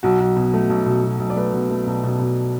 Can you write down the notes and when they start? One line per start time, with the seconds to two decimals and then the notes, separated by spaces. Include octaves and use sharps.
0.03 B1 F#4
0.20 B1
0.36 B2
0.54 A3
0.70 B1
0.86 B2
1.03 B2
1.19 B1
1.30 D5
1.36 A3 B4
1.53 B2
1.70 A3
1.87 B1
2.03 B2
2.20 B2